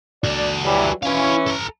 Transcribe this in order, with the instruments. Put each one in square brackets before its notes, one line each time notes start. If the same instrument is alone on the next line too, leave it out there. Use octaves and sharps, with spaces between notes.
[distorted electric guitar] F#4 A4 [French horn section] D5
[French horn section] E3 F#3 G3
[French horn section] E3 C#4 [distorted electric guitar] E4 F5
[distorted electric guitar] A4 A#5